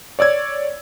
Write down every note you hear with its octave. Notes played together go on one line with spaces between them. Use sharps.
C#5 D5 E6 G#6